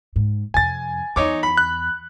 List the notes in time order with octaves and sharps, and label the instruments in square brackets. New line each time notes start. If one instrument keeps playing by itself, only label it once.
[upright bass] G#2
[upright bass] F2 C3 [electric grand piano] G#5 A6
[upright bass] E2 [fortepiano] D#4 C#5 D6
[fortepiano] B5
[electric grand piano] F#6